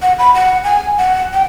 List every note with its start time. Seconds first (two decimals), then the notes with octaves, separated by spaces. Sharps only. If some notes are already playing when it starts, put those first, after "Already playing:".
0.02 F#5
0.19 B5
0.34 F#5
0.64 G#5
0.98 F#5
1.33 G5